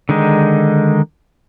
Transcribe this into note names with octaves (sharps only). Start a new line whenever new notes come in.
D3 D#3 G#3 D#4